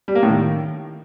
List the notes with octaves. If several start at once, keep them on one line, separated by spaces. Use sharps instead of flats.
G3
A#3
A2
D#3